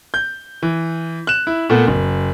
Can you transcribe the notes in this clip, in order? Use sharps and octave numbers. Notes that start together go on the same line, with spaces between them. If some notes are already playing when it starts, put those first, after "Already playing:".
G6
E3
F#6 E7
E4
A#2 A3 B3
F#1